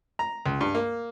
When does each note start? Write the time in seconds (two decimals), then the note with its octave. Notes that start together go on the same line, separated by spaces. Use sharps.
0.19 A#5
0.46 C#2
0.61 G2
0.75 A#3